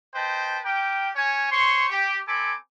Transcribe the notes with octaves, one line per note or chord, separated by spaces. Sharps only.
B4 C5 D#5 G5 A5
G4 A#4 G5
C#4 C#5 G#5
C5 C#5 C6 C#6
G4
C4 A4 G#5 B5 D6